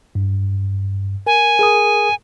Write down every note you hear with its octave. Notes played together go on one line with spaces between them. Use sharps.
G2
A#4 G#5
G#4 A#4 D#6